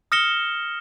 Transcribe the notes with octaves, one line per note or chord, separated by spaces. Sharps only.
D#6 F6 A#6 C#7 E7 G7